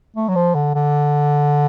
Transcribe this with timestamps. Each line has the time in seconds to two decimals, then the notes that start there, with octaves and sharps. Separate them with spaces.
0.16 A3
0.28 F#3
0.35 F3
0.55 D3
0.75 D3